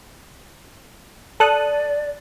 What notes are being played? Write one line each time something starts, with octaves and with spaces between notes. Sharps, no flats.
A4 D5 D#6 F#6